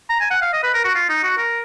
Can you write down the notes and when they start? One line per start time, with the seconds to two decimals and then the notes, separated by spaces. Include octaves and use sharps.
0.10 A#5
0.20 G#5
0.31 F#5
0.42 F5
0.53 D#5
0.63 B4
0.74 A#4
0.84 F#4
0.95 F4
1.09 D#4
1.23 F#4
1.38 A#4